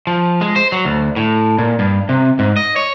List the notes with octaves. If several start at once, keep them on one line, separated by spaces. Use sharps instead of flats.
F3
G#3
C5
F#3
D2
A2
A#2
G2
C3
G#2
D#5
C#5